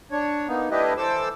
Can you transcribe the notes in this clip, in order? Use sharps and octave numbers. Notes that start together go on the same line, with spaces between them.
D4 C#5
A#3 B3 D#4
A3 D4 E4 G4 B4 D#5
E3 A4 C5 D6 E6